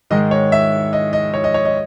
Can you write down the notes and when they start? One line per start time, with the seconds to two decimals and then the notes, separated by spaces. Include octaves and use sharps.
0.10 G#2 D#3 G#3 D#5
0.31 C#5
0.52 E5
0.93 D#5
1.13 D#5
1.34 C#5
1.44 D#5
1.54 C#5
1.65 D#5